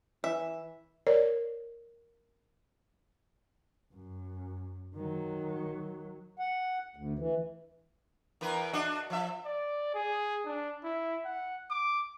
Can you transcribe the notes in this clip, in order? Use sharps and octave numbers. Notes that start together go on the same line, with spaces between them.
E3 E5
A#4 C#5 D5
F#2
D#3 F#3
F#5
D2
E3
E2 A#4 B4
D4 F#4 D#5
F3 E5
D5
G#4
D4
E4
F#5
D6